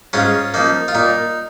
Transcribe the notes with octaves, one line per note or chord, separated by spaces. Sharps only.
G#2 C#4 F4
F3 A#3 D#4
F4
A#2 D#4